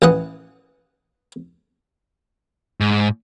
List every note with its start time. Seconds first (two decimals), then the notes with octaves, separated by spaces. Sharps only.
0.02 A1 E3 F#5 D#6
2.80 G#2